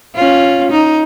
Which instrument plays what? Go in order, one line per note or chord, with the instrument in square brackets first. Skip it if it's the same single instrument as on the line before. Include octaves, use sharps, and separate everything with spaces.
[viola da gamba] C#4 F4
D#4